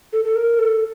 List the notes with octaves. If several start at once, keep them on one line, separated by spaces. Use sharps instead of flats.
A4
A4
A#4
A4